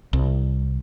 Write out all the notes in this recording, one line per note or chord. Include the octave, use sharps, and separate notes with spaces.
C2